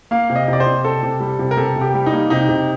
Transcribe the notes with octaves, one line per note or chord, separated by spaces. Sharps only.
A#3 F5
C3
D#5
C3
D5
C5
C3
C3 A4
C3
G3
C3
A#4
C3 A4
C3
G4
G3
D#4
A#3
C3 D#4
C3